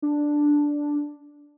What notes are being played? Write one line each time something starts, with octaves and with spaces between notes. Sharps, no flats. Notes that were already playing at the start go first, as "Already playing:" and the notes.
D4